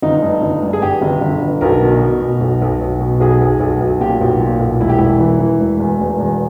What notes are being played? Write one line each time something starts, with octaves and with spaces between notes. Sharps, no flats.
G1 D#4
G2
G1
G2
G#4
G2 G4
G1
G1
G1
B1 A#4
B2
B2
B2
B1
B1
B1
B2
B1 G#4
B1
B1
B1
A#2 G4
B1
A#2
B1
E1 E4
G4
E1 E4
E3
E3
E1
E2
E1
E2